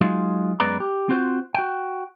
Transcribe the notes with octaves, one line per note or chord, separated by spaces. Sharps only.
F#3 G#3 D#4 F4
F#2 G#3 B3 B4 D5 A#5
G4
C4 F4 F#4 C5
F#4 G5